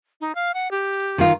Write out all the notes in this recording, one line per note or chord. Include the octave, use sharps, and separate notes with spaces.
D#4
F5
F#5
G4
D#3 F4